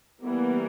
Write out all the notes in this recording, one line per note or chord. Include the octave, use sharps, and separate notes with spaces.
E3 G3 A#3 B3